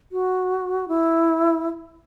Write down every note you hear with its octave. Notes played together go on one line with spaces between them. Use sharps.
F#4
E4